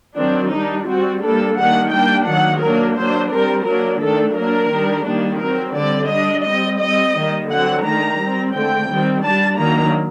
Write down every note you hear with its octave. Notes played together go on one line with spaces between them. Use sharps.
D#3 F#3 C4 D4
G3 D4 D#4
G3 C4 F#4
G3 A#3 D4 A4
D#3 G3 A#3 D4 F#5
G3 A#3 D4 G5
D#3 F#3 A#3 F#5
F#3 A#3 D4 A#4
F#3 A#3 D4 C5
G3 C4 A#4
F#3 A#3 D4 A#4
D#3 A3 D4 A4
F#3 A#3 D4 A#4
D#3 G3 D4
D#3 G3 A#3 D4
F#3 C4 A#4
D3 G3 C4 D5
G3 D4 D#5
G3 C4 D#5
G3 C4 D#5
D#3 G3 A#3
D3 F#3 C4 F#5
D#3 A3 D4 A#5
G3 C4
D3 A3 C4 G5
D#3 G3 C4
G3 D4 A5
D#3 F#3 A#3 D4 A#5